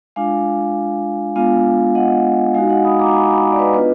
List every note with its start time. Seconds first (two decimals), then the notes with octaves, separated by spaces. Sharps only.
0.16 G#3 D4 F4 F5 G#5
1.36 G#3 B3 D4 F4 F5 G#5
1.95 D#5 F#5
2.54 G#3 D#4 F#4 F5 G#5
2.69 D#5 F#5
2.84 B5 D#6
2.99 A#5 D6
3.14 G#5 B5
3.29 G#5 B5
3.52 D5
3.59 B4 D#5
3.73 B3 D4 F4 B4 D#5